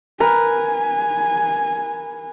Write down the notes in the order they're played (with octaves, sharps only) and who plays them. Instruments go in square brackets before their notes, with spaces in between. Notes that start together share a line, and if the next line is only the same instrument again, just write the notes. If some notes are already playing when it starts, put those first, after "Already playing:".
[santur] A#4 B4 A#5 [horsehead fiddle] G#5